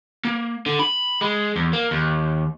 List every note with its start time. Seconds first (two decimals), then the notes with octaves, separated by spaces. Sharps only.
0.25 A#3
0.66 D3
0.79 B5
1.21 G#3
1.56 E2
1.73 A#3
1.91 D#2